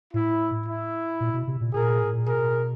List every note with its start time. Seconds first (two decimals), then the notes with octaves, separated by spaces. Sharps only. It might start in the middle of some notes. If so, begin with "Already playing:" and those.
0.14 A2 E4
0.67 E4
1.20 A#2
1.34 B2
1.47 C3
1.61 A#2
1.74 A#2 G#4 A#4
2.01 A2
2.14 A#2
2.27 B2 G#4 A#4